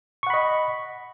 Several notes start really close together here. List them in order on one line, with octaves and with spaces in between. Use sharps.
C#6 F#5 B5 D#5